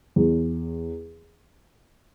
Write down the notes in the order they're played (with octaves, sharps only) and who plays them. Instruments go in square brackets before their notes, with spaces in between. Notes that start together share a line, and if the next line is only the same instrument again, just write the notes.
[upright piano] E2